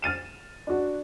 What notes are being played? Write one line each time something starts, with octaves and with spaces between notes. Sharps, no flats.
F6 A6 D#7 E7
D4 F#4